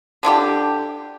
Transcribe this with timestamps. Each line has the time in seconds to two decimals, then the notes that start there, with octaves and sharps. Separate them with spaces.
0.23 D3 D4 E4 G4